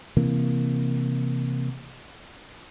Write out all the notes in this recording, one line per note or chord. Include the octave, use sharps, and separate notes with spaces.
C3 E3 A#3